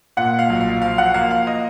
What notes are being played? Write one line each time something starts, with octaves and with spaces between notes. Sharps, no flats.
A#2 F#5
F5
B1
F5
F3 F5
F#5
A#3 F5
F5
D#5